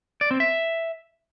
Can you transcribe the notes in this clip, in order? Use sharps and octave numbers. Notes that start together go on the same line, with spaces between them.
D5
C4
E5